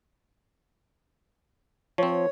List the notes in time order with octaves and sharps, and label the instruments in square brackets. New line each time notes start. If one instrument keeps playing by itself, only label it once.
[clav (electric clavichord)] F3 C4 [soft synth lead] C#5